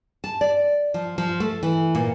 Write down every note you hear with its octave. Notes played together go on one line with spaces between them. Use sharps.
A5
D5
F3
F3
A3
E3
A#2